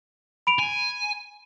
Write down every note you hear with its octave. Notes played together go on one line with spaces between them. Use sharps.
B5 D7 F7
G#5